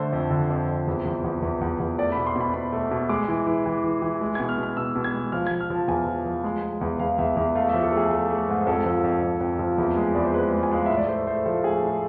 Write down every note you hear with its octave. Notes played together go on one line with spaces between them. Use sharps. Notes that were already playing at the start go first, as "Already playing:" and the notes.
Already playing: D3 A3 C5
F2
D3
F2
F2
E2
E2
E2
E2
E2
E2
A3 D5
B2 B5
C6
B2 B5
B2 B5
A3
B2
G#3 D6
E3
E3
E3
E3
E3
G#3
B2 G#6
F6
B2
F6
B2 E6
B2
G#6
G#3
F3 F6
F3 G#6
F6
F3 A5
E2 G#5
F3
F3
G#3
G#3
E2
E2 F5
E2 E5
E2 E5
A3 F5
F3 E5
A4
A3 G#4
A3
A3
G#2
F2 A4
F3
F2
F2
F2
F3
E2
G#3
E2 D5
C5
G#3 B4
G#3
G#5
G#3 F5
A2 E5
D5
A3 C5
A3 C5
F3 A4
A2 G#4
A2 A4